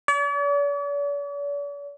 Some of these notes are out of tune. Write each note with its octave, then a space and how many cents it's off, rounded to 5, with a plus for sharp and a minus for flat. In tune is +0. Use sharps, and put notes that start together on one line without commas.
D5 -45